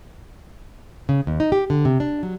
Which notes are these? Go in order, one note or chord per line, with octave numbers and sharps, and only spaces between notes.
C#3
D#2
D#4
G4
D3
C3
D4
F#3